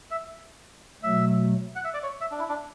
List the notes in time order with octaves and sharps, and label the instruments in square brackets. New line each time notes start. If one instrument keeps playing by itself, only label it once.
[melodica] E5
[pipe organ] B2 F#3 A3 [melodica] E5
[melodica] F#5
E5
D5
C#5
E5
D4
E4
D4